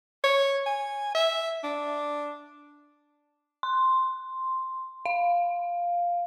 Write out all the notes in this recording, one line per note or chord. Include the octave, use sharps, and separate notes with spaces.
C#5
G#5
E5
D4
C6
F5